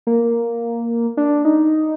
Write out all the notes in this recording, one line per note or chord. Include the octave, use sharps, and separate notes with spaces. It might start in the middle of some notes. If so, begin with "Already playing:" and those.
A#3
D4
D#4